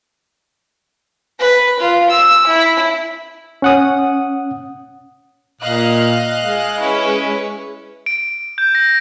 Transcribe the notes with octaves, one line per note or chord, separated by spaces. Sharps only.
B4
F4
E6
E4
C#4 F#5 D#6
A#2 D#5 F5 F#6
G#3
C#4 E4 B4
D7
G6
A#6